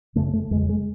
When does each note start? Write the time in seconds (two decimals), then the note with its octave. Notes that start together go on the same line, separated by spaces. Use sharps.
0.15 F#2 C#3 A3
0.33 A3
0.51 F2 G#3
0.56 C#3
0.69 G#3